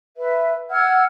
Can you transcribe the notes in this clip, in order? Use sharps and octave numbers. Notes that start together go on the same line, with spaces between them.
B4 E5
F#5 E6 F6 G#6